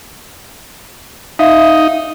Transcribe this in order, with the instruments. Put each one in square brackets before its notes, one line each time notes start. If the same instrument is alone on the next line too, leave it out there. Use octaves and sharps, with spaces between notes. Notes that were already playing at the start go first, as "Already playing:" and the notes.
[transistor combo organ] D#4 [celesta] E5 F5